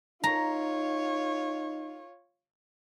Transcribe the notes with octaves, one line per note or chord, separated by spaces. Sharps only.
D#4 F4 C#5 A#5